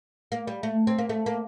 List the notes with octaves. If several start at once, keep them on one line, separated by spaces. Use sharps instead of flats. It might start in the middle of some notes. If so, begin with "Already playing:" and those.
A#3
G3
A3
C4
A#3
A3
A#3